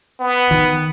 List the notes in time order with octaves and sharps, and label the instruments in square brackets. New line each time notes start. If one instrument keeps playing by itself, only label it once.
[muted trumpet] B3
[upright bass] D#3